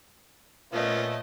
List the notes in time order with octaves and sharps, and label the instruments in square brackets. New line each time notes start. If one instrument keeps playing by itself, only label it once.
[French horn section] A#2 B4 [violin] A3 [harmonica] B3 C#4 F4 [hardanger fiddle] D#5